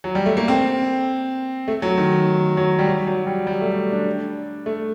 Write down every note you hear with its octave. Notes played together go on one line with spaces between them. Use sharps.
F#3
G3
A3
A#3
C4
A3
F#3
D#3
F#3
G3
F#3
F#3
G3
G3
A3
D4
A3